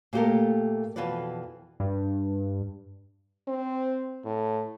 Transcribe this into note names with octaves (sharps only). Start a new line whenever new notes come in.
A#2 A3 F#4 G4 A4 A#4
F2 B2 E3 F4 B4 D5
G2
C4
A2